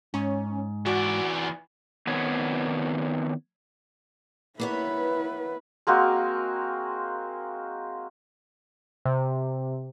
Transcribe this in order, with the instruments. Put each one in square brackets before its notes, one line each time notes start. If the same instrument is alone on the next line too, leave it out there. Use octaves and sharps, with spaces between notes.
[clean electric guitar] G#2 [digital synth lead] C#4
[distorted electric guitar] E3 D5 [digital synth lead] F#4
[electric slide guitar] D#3 B3 C4 B4 C#5
[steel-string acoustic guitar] A#3 B3 C#5 [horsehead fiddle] E4 B4
[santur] G#3 A#3 C4 F#4
[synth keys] C3